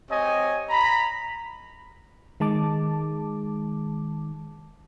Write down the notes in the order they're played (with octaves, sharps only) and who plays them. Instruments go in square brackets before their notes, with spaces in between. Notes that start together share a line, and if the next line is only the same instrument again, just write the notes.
[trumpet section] C4 G4 C#5 D#5 G#5
A#5 B5
[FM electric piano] D#3 G#3 A5 D6